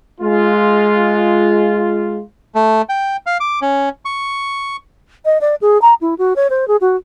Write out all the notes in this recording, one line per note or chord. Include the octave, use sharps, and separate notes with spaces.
G#3 F4
A3
G5
F5
D6
C#4
C#6
D#5
D5
G#4
A#5
E4
F#4
C#5
C5
G#4
F#4